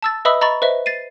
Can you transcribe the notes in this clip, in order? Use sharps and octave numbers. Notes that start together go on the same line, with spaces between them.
A5 E6 A6
B4 D#5 E5 B5 D#6 E6
D#5 A#5 B5 C#6 A6
B4 C5 D#5 E5
A6 C7 D#7